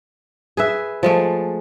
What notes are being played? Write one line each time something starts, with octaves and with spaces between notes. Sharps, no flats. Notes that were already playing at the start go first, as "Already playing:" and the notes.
G#4 B4 E5
F3 G#3 A3